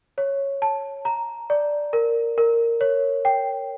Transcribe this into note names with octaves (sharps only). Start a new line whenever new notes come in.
C#5
A5
A#5
D5
A#4
A#4
C#5
G5